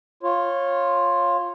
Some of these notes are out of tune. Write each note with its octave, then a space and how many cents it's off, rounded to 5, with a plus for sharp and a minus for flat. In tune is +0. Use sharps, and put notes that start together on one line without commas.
F4 +0 C#5 -20